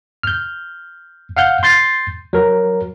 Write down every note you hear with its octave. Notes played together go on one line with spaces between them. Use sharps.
F6 G6
F5 F#5 F6 G6
C6 G6 A6 C7
F#3 A#4